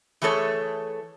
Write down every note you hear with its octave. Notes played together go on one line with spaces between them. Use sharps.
E3 A3 G#4 A4 C#5